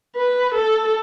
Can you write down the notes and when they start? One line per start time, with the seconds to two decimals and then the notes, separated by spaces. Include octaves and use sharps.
0.16 B4
0.55 A4